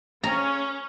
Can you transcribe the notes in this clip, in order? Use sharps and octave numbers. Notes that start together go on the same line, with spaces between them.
A#3 C#4 G#4 C#5 A#5